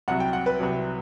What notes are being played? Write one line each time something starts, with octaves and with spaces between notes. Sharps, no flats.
C2 C3 F#3 F#5
G5
F#5
B4
C2 C3 F#3